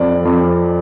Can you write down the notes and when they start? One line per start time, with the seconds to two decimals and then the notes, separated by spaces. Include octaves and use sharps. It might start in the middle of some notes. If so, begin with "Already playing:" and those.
Already playing: F2 D5
0.25 F2